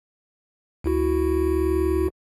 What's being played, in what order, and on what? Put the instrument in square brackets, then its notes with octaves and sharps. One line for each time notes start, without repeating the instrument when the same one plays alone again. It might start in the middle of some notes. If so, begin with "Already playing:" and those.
[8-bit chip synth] D2 E4 F#4